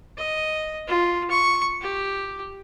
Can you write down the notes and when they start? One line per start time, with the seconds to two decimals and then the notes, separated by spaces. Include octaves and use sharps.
0.18 D#5
0.87 F4
1.30 C#6
1.81 G4